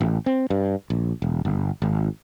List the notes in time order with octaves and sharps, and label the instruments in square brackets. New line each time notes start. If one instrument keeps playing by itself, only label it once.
[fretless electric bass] A1
C4
G2
A#1
E1
G1
G#1